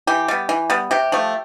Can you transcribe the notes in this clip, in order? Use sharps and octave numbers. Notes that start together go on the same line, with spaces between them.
E3 G4
G3 B3
E3
G3 B3
C3 G4
F3 A3